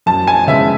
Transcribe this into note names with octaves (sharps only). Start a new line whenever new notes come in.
F#2 A5
G#5
C#3 G#3 B3 E5